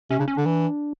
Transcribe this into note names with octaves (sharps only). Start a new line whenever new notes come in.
C3 C#4
C#3 D4
C#4
D3 D4
E3